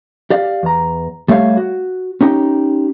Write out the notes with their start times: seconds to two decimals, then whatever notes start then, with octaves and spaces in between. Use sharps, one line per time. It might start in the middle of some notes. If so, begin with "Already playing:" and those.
0.30 G4 D5 F5
0.63 E2 A#5
1.28 G3 A3 G4 C#5 F5
1.57 F#4
2.21 C#4 D#4 G4 G5